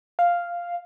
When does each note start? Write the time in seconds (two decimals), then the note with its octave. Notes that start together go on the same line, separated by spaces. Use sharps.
0.19 F5